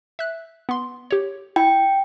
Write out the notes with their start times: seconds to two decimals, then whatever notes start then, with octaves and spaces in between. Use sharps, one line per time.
0.19 E5 F#6
0.69 B3 C6
1.11 G4 C#5
1.56 E4 G5